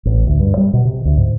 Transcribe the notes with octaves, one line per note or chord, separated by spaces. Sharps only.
A1
D2
G2
G3
B2
C3
D2
G#2